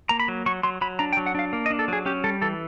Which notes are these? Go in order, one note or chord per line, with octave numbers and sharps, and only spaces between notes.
A#3 A#5
B5
F#3
F#3 C#6
F#3 C6
F#3 B5
D4 A#5
G5
F#3
F#5
D4 F5
A#3
D#5
D4
A4
F#3 G#4
C#4 G4
G3 A4
E3 A4